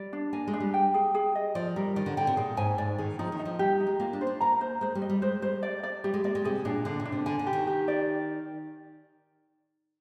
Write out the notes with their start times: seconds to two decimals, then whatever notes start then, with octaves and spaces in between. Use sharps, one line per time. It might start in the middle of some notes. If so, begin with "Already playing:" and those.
Already playing: G3 D5
0.13 D4
0.33 A#3 G#5
0.47 G#3
0.53 D4
0.60 G3
0.74 G5
0.94 G#4
1.15 G#4
1.35 D#5
1.55 F3 D5
1.76 G3 A#4
1.96 D#3 D5
2.06 D3
2.17 D3 G5
2.27 C3
2.37 A#2 G#4
2.57 G#2 G#5
2.78 G#2 D5
2.98 D#3 G#4
3.19 F3 D#4
3.32 D#3
3.39 D#4
3.45 F3
3.59 G3 G4
3.80 D#4
3.87 G#3
4.00 A#3 F4
4.13 D4
4.21 C5
4.27 D4
4.41 A#3 A#5
4.61 C5
4.81 G#3 C5
4.95 G3
5.02 D#5
5.09 G3
5.22 G#3 C5
5.42 G3 C5
5.63 D5
5.83 D5
6.04 G3 G4
6.14 G#3
6.24 A#3 D5
6.35 G#3
6.44 C3 G#4
6.65 A#2 D4
6.85 D3 D4
7.00 A#2
7.05 D4
7.12 C3
7.26 D3 G#5
7.39 D3
7.47 G4
7.53 D#3
7.67 G4
7.88 D5